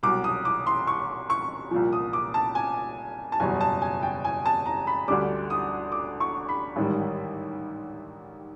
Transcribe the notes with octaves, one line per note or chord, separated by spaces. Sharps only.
C2 B2 F#3 D6
D#6
D6
C6
C#6
C#6
C2 A#2 F3
D#6
D6
A5
G#5
A5
F#1 E2 B2 G3 G#5
A5
G#5
G5
G#5
A5
A#5
B5
D2 D3 G3 D6
D#6
D6
C#6
B5
A1 G#2 D#3 G3